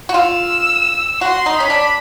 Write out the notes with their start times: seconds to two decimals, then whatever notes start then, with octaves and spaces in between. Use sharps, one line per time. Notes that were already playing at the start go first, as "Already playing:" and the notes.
0.09 F#4
0.13 F4 E6
1.21 F#4 C6
1.46 D#4
1.58 C#4 B5
1.70 D4